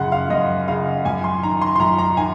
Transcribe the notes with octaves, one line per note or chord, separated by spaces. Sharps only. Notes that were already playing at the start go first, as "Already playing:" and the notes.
Already playing: F#2 C#3 F#5 C6
F5
F#2 D#5
C#3 F5
F#2 G#5
C6
D#3 A#5
C6
C6
F#2 A#5
A#5
D#3 G#5